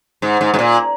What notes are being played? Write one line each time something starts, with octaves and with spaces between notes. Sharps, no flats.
G#2
G#2
G#2
A#2